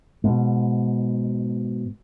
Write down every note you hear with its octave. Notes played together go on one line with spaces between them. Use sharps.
G#2 B2